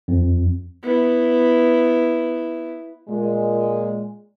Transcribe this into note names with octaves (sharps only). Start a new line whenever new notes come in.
F2
B3 E4
A#2 G#3